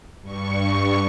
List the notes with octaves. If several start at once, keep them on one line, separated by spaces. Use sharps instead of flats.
G2 C#6